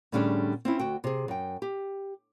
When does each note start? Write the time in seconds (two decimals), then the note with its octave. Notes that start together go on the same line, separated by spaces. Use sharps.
0.12 A2 D3 G3 C#4 D4 G#4
0.65 C4 C#4 E4
0.79 D2 F#4 G5
1.04 C3 G#4
1.28 F#2 G5
1.62 G4